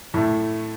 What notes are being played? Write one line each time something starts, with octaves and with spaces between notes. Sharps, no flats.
A2 A3